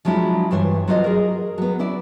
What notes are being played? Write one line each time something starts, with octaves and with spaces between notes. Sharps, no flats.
F3 F#3 G#3 D4 E4 F4
G2 E3 C5 C#5
F#3 F4 F#4 C5 D#5
G#4 A#4
F#3 B3
C#4 E4 D5